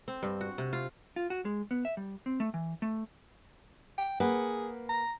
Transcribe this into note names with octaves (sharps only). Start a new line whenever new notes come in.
C4
G2
F#4
C3
F4
F4
F#4
G#3
B3
E5
G3
C4
A3
E3
A3
G5
A#3 G#4 B4 F#5
A#5